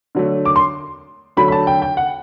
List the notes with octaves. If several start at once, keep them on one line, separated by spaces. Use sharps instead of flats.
D3 F#3 A3
D6
C6
D3 F#3 A3 B5
B5
A5
G5
G5
F#5